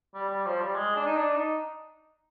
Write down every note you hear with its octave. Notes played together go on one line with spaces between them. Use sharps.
G3
G3
F3
G3
G#3
D4
D#4
D4
D#4